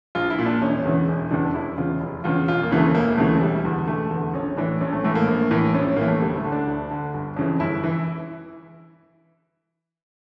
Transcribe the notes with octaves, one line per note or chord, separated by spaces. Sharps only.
A#1 F4
E4
A#2
D4
E1 C#4
E2 C#3 E3
E1
E2 C#3 E3 D4
D4
F1 E4
E2 C#3 F4
F1
E2 C#3 F4
E1 F4
A#3
D2 C#3 E3
A3
E1 A#3
D2 C#3 E3 A3
E1 G3
E2 D3
E1 A3
E2 D3
A#1 C#4
A2 E3 D4
A#1 C#4
A3
A2 E3 A3
A#3
A#1
A2 E3
A#1 C#4
C#4
A2 E3 A#3
A3
D2 G3
A3
D3
D4
D2
D3
G1
F2 C#3 E3
G1 E4
E3